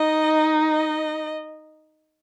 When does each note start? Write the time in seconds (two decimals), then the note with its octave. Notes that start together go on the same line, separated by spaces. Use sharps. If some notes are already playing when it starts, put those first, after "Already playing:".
Already playing: D#4 D#5
0.70 D#5